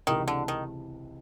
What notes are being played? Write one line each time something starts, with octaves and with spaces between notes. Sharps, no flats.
C#2 C3 D#3 E3
D3
D#3